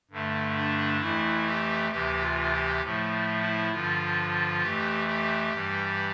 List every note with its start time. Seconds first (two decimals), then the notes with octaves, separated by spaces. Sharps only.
0.11 G2 D3 A3
0.56 D4
1.00 F2 E3 A3 E4
1.46 G4
1.91 D2 C3 E3 G4
2.21 F4
2.51 G4
2.82 A2 F3 A3
3.42 E4
3.72 G2 D3 F3 F4
4.62 F2 E3 A3 G4
5.07 G4
5.52 G2 E3 G3